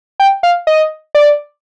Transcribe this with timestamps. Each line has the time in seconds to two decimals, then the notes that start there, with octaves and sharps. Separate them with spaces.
0.20 G5
0.43 F5
0.67 D#5
1.15 D5